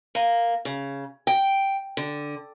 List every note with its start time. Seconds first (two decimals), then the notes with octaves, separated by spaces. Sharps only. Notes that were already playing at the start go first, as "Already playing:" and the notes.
0.15 A#3
0.65 C#3
1.27 G5
1.97 D3